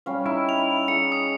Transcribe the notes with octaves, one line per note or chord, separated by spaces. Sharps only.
G3 C#4 F5
D#4 E4
F7
G#4 C#7
D#6 C#7